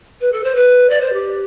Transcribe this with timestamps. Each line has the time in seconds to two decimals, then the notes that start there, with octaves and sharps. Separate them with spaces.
0.21 B4
0.32 A4
0.44 C5
0.55 B4
0.90 D5
1.01 C5
1.13 G4